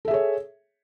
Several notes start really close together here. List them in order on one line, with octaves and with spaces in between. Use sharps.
A4 E5 G#4 C#5